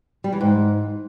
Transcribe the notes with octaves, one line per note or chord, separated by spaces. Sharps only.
G3
E3
G#2